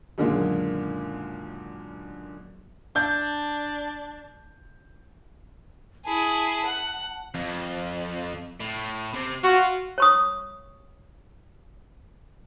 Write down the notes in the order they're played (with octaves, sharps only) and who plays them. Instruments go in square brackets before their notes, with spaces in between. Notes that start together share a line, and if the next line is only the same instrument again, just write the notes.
[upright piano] F#2 A#2 D3 D#3 G#3 A#3
[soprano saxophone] D4 [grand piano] G6
[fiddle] E4 G#4 [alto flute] A5
[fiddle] F#5
[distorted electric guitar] F2
A2
C3 C4
[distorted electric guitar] F4 [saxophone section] F#4
[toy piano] C#5 C#6 D#6